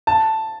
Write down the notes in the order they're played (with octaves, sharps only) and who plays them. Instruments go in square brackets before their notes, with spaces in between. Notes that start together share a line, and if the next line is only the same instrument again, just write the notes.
[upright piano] A5